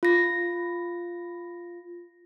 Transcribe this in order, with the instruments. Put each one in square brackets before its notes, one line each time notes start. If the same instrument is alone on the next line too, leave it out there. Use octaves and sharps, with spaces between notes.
[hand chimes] F4 A#6